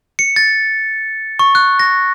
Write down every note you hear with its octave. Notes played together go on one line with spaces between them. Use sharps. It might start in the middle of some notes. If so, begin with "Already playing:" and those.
C#7
A6
C#6
F#6
A#6